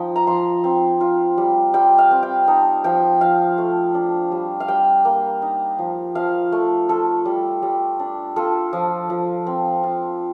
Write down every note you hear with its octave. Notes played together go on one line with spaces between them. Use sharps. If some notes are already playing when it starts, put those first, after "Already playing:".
Already playing: F3 D#4 G5
A#5
F3 C6
C4
F4
G3
G3 G5
F5
C4
G5
D#4 A5
F3 G5
F3 F5
A3
D4
G3
F5
G3 G5
A#3
D#4
F3
F3 F5
A3
F4 A4
G3
G3
D4
F4 A4
F3
F3
C4
F4